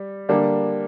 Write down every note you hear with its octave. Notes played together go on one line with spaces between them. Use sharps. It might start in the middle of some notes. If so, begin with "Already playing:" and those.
Already playing: G3
D3 G3 A#3 D4